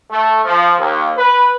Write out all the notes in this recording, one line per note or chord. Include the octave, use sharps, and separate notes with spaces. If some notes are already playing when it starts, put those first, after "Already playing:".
A3
F3
D#2
B4